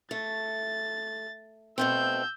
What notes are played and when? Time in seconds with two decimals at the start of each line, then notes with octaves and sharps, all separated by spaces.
0.11 A3 A6
1.78 B2 A3 C4 E6 G6